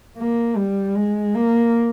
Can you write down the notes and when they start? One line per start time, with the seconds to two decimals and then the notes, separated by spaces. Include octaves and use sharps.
0.18 A#3
0.57 G3
0.95 G#3
1.34 A#3